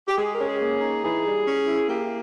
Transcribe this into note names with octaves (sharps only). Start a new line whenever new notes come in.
G4
G#3 G#4
A#4
C#4
G#4
A#3
D#4
E3 G#4
G3
C#4
E4
A#3 G4